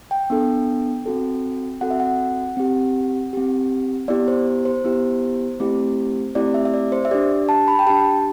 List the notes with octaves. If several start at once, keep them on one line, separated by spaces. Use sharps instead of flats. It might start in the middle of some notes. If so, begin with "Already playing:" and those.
G5
B3 D4 A4
C4 F#4 A4
C4 F#4 A4 F#5
E5
F#5
C4 G4
C4 G4
B3 E4 G4 D5
C5
C5
B3 E4 G4
A3 C4 E4 G4
A3 C4 E4 G4 D5
E5
E5
D5
C5
E5
D4 G4 D5
A5
B5
G5
D4 G4 A5